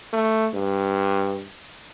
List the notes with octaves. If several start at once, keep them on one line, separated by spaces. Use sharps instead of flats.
A3
G2